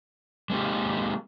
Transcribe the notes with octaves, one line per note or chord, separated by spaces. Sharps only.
G#3 A#3 C4 D#4 G4